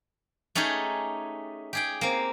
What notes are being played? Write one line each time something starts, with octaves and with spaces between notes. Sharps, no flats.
A3 C#4 D#4 G4 G#4
G4 G#4 G5
A#3 C4